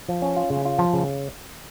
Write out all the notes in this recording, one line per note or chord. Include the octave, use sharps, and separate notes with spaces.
F3
C#4
F4
C#3
F4
F3
C#3